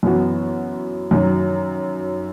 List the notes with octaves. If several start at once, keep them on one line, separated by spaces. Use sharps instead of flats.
F#2 E3 B3 F#4
F#2 D#3 F#3